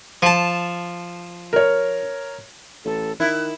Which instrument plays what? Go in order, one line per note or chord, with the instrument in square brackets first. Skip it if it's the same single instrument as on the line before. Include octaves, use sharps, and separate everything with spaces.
[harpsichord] F3 A5
[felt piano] A#4 C#5
[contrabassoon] A1 [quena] A4
[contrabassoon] D#3 [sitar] E4 [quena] F#6